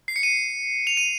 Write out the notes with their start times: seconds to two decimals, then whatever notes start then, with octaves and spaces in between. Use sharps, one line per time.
0.08 C7
0.16 C#7
0.23 D#7
0.87 F7
0.97 D#7